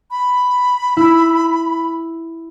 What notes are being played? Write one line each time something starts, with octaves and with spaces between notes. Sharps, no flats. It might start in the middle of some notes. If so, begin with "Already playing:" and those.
B5
E4 E6